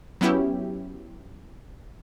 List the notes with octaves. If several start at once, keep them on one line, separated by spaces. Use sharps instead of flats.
F#3 B3 C#4 E4 G4